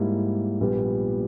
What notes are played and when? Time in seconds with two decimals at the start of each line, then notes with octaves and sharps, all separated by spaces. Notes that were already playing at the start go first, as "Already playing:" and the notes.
Already playing: G#2 G3 A#3 E4
0.60 A#1 A#2 G3 B3 G4